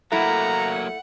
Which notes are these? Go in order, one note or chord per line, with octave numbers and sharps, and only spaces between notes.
F#3 A3 A#3 E4 F#5 A#5